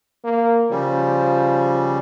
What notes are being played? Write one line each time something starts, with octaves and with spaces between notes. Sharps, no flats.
A#3
C#3 F3 G3